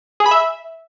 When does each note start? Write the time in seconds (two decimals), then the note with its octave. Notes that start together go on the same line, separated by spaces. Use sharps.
0.20 G#4
0.26 B5
0.31 E5